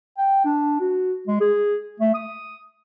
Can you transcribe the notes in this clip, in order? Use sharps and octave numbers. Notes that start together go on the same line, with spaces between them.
G5
D4
F#4
G#3
G#4
A3
D#6